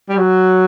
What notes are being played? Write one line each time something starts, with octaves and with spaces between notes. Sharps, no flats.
G3
F#3